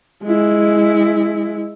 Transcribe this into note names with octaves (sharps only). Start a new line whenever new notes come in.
G#3 E4